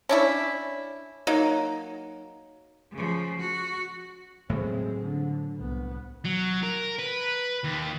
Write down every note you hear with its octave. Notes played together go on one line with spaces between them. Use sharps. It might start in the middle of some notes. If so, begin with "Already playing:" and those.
C#4 D4 E4
F#3 A#3 D#4
C#3 F3
F#4
A2 C#3 F#3 G#3 C4
D3
C2 B3
F#3
A#4
B4
D#2